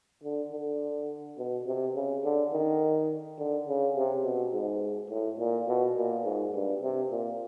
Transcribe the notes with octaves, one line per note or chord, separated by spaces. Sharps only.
D3
D3
B2
C3
C#3
D3
D#3
D3
C#3
C3
B2
G#2
A2
A#2
B2
A#2
G#2
G2
C3
A#2